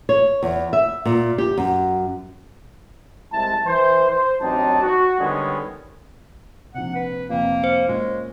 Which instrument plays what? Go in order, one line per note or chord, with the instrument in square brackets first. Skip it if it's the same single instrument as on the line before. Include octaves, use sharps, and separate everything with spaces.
[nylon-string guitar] C#5
E2
E5
A#2
G4
F#2
[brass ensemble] C2 G#3 E4 A5
E3 C5
C5
A1 F#3 C4 D4 D#4 A5
F#4
D3 D#3 G3 G#3 B3 C#4
[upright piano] A#1 C3 [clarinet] F#5
[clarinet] B4
[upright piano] F2 C3 G5 [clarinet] A#3
[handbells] C5
[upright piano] A#2 C#4 [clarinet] G#3